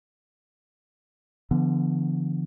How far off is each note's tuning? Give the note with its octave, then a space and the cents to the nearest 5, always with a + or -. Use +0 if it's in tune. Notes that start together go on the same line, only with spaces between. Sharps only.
D3 +0 F3 -40 B3 +5